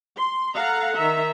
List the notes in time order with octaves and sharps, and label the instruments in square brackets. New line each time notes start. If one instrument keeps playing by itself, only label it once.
[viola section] C6
A4 F5 F#5 A#5
D#3 E5 A#5